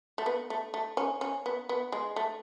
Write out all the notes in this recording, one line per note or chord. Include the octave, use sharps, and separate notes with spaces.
A3
B3
A3
A3
C#4
C#4
B3
B3
G#3
A3